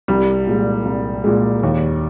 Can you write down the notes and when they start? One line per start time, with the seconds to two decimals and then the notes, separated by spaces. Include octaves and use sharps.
0.08 C2 G3
0.47 A#2 G#3
0.85 C2
1.24 A#2 G#3
1.63 D#2